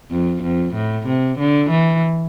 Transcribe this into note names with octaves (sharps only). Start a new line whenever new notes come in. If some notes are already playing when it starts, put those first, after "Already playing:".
F2
F2
A2
C3
D3
E3